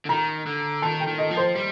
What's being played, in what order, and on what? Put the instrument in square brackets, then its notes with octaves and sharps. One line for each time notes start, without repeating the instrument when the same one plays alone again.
[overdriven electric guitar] D3
[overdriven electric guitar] D#3 [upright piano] A#5
[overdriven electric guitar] D3
[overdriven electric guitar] D#3 [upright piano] A5
[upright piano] G5
[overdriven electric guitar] D#3
[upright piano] D#5
[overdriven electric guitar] F3
[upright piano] C5
[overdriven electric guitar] G3